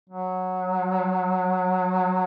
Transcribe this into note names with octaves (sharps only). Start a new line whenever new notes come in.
F#3